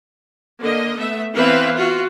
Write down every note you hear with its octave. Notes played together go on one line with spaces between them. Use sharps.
D3 A#3 D#5
A3 B3 E5
E3 B3 C4 B4 E5 F5
F4 F#4